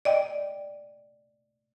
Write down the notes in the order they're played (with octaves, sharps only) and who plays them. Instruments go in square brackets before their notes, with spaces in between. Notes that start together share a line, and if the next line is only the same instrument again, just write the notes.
[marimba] D5 D#5 G5